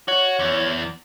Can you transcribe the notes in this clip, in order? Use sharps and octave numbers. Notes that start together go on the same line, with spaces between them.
F#4 C#5
E2